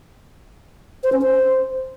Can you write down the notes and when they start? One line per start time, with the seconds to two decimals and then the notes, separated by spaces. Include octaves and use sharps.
1.03 C5
1.12 C#4
1.21 C5